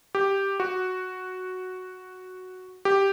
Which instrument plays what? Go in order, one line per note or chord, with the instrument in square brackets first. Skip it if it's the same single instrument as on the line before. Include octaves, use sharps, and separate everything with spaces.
[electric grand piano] G4
F#4
G4